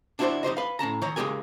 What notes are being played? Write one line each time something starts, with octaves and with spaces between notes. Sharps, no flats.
D4 E4 F#4 A#4 C5 D5
D#4 G4 C5 D#5
B4 F5
A2 C#4 A5 A#5
D#3 C#5 A#5
C#3 G#3 C4 G4 A#4 G#5